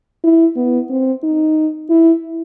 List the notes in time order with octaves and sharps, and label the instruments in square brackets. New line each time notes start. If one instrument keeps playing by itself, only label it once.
[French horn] E4
B3
C4
D#4
E4